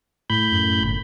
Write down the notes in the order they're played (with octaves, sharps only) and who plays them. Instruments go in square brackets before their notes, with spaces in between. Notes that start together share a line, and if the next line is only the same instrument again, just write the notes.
[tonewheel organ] A2 B5 G6
[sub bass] F#2
G1